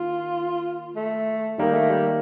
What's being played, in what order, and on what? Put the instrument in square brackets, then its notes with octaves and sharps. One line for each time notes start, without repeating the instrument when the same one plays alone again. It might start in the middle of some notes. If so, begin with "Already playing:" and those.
Already playing: [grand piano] D#3 A#3 [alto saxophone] F4
[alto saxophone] A3
[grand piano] D#3 A#3 D#4 A#4 [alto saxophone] G3
[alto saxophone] A3
G3